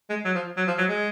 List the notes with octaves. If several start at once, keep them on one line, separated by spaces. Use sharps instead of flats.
G#3
F#3
F3
F#3
F3
F#3
G#3